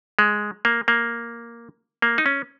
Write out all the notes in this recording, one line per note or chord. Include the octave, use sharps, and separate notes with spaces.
G#3
A#3
A#3
A#3
D#4
C#4